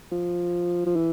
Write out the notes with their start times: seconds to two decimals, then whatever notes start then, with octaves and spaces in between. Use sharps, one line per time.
0.12 F3
0.86 F3
0.96 E3